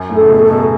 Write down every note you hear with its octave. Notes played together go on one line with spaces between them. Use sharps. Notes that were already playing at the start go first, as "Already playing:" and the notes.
Already playing: F#2
A2
A4
C#3
B2
A2 A4
B2